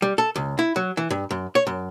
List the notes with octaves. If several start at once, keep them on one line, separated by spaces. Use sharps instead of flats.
G3
A4
C#2
E4
F#3
E3
G2
F#2
C#5
F#2